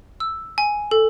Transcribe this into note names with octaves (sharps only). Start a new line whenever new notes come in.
E6
G#5
A4